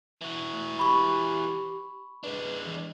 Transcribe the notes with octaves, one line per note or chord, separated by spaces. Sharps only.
E3 F#4
A3
G4 B5 C#6
G#3 D4 B4
E3